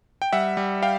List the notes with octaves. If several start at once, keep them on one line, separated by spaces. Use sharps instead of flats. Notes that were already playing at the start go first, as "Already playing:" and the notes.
G5
G3 E5 F#5
G3
F5 G5